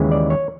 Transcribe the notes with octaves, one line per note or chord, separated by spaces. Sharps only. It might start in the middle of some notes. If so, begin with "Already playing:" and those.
Already playing: D#2 C#3 E3 G#3
D5
C#5